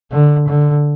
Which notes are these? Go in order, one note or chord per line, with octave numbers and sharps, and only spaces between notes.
D3
D3